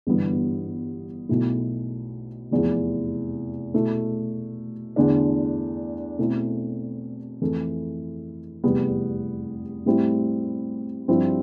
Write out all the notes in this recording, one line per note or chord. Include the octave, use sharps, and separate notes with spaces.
G1 G2 E3 B3
B1 B2 A3 E4
F1 E2 C3 F3
B2 A3 E4
E2 D3 A3 D4
B2 A3 C4 E4 A4
F2 E3 A3 E4 A4
F1 E2 C3 G3 B3
A2 G3 C4 E4
G2 F3 C4 E4 G4